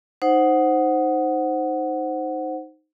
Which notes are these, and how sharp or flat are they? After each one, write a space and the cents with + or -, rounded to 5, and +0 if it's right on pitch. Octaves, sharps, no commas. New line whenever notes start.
D#4 +0 C5 +5 F#5 +0